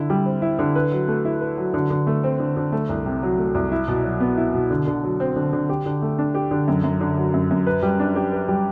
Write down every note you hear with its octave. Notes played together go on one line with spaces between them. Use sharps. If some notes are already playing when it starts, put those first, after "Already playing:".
Already playing: D3 E4
G3
C4
E4
D3
B4
F#3
A3
E4
B4
F#3
D3
D3
A3
C4
D3
D3
A3
C2
C3
F#3
A3
C2
E4
B2
F#3
B3
E4
B2
D3
D3
F#3
C4
D3
D3
G4
D3
A3
D4
G4
D3
F#2
F#2
D3
F#3
F#2
F#2
B4
G3
D4
G4
B4
G3